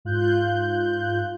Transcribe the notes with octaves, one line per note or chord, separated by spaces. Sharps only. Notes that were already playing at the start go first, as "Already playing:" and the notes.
G#2 F4 F#6 G6